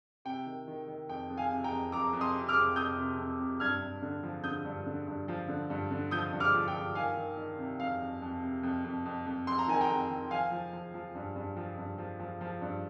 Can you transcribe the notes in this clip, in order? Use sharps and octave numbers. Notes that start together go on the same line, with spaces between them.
C3 G5
D#3
D#3
D#3
F2 G5
F2
F5 G#5
C3
G5 A#5
F2
F2 A#5 D6
F2
C6 D#6
C3
D6 F6
F2
F2 D#6 G6
C3
F2
C3
G2 F6 G#6
G2
D3
F3
D3 D#6 G6
G2
D3
G2
F3
D3
G2
D3
F3 D#6 G6
G2
D6 F6
F3
G5
G2
D#3 F5 G#5
D#3
D#3
C3
F2 F5
F2
F2
C3
F2
F2
F2
F2
F2 C6
A#5
D#3 G#5
G5 A#5
F2
D#3
F3 F5 G#5
F3
F3
F3
G2
G2
F3
G2
F3
F3
F3
G2